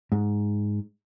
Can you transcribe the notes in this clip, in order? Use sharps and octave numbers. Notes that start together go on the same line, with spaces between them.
G#2